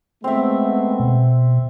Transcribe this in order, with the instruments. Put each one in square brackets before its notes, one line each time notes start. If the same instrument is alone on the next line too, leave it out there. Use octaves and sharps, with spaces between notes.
[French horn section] G#3 A3 B3 [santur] C4 E5
[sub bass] B2